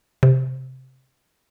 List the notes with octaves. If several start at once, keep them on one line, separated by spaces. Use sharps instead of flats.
C3